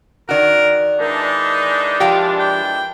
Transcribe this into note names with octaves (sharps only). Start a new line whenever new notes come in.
D#3 F#4 A#4 D5 F#6
E3 G#3 D4 D#4 A#4
F3 F4 G4
G5